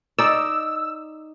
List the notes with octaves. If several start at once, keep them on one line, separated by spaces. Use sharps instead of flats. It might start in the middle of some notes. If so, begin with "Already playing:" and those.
D#4 D5 E6